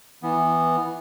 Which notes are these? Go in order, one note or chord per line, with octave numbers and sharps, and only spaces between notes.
E3 B3